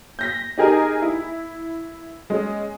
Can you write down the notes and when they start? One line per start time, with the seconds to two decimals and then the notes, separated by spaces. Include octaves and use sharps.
0.19 G6 A#6 B6
0.58 D#4 G4 G#4 A#4 D#5 G#5
1.02 E4
2.30 G#3 C#4